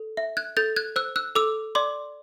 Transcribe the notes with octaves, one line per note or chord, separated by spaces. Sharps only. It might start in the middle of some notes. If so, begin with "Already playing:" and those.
Already playing: A4
E5
F#6 G#6
A4 G6 A6
F#6 G#6
C5 E6 F#6
E6 F#6
A4 D6 E6
D5 C6 D6